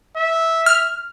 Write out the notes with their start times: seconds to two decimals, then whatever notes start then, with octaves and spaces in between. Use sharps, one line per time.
0.17 E5
0.66 F6